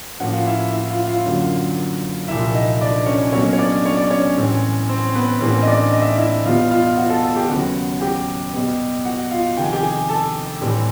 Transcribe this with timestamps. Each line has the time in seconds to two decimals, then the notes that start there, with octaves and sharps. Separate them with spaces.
0.20 A2 F3 A#3 C#4 F#4 F#5
0.33 F4 F5
0.46 E4 E5
0.72 E4 E5
0.89 F4 F5
1.07 F4 F5
1.25 F#2 D3 F#3 A#3
2.28 C2 A#2 F3 E4 E5
2.54 D#4 D#5
2.81 D4 D5
3.06 C#4 C#5
3.32 B2 F#3 A#3 C#4 C#5
3.53 C#5
3.58 D4 D5
3.85 C#5
3.97 D5
4.10 C#4 C#5
4.36 A2 E3 G3 C4
4.89 C4 C5
5.15 B3 B4
5.40 A2 E3 G3 A#3 C4 C#4 C5
5.62 D#5
5.67 D4 D5
5.93 D#5
6.02 E5
6.10 D#4 D#5
6.18 E4 E5
6.45 E2 B2 G3 B3 F4 F5
6.70 F4 F5
6.97 F#4 F#5
7.10 A4 A5
7.23 A4 A5
7.36 G4 G5
7.48 D#2 C#3 F#3 B3 F#4 F#5
8.00 G4 G5
8.53 B2 G3 B3
9.05 F#4 F#5
9.31 F4 F5
9.57 F2 C3 D#3 G5
9.64 G#5
9.72 G4 G5
9.83 G#4 G#5
10.09 A4 A5
10.61 A2 E3 G3 C4